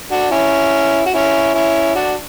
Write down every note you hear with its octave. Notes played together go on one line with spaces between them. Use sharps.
D4 F#4
C#4 E4
F#4
C#4 E4
C#4 E4
D4 F#4